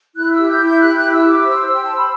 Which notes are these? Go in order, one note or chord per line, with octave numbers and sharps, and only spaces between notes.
E4 F#6
E6
G4
G6
E4 G6
G4 F#6
F#6
E4
E6
G4
D6
C5 E6
C5
G5
C5 A5
B5